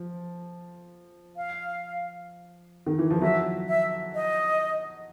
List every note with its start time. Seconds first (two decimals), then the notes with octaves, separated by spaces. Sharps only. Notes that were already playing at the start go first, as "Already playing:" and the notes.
Already playing: F3
1.37 F5
2.87 D#3
2.99 E3
3.10 F3
3.21 F#3 E5
3.69 E5
4.15 D#5